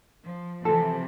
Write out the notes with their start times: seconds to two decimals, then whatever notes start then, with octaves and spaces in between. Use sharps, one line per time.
0.24 F3
0.65 C3 E3 F3 A4